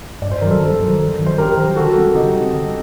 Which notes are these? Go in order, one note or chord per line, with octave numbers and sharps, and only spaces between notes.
G2 D5
C5
D#3 F#3 A#4
A4 C5
G2
D#3 F#3
G2
D#3 F#3
C5
G2 G4 A#4
D#3 F#3
D3 F#4 A4
G3 C4
D3 D#4 G4
G3 C4
D3